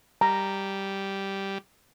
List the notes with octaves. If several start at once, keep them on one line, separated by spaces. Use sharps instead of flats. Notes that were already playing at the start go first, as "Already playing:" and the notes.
G3 A#5